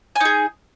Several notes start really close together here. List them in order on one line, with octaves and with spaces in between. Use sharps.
G#5 D#4 G#4